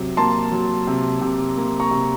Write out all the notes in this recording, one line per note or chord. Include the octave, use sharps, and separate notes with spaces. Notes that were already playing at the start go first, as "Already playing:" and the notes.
Already playing: C3 F#3
A#3 A5 C6
F#3
C3
C3
A#3
A#5 C#6
C3